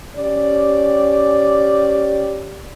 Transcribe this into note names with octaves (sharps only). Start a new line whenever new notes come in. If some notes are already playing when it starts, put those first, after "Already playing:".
C#4 G4 D5